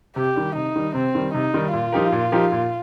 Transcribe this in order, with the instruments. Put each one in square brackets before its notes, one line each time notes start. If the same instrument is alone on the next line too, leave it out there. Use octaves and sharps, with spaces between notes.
[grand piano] C3 [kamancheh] G4
[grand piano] D#3 G3
[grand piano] C3 [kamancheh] D#4
[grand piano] D#3 G3
[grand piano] C3 [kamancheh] C4
[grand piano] D#3 G3
[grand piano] C3 [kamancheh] D#4
[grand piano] D#3 G3
[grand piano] A#2 [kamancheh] F4
[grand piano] F3 D#4 G4 A#4
A#2
F3 D#4 G4 A#4
A#2